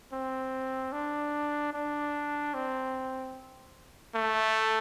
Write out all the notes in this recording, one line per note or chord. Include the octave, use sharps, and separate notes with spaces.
C4
D4
D4
C4
A3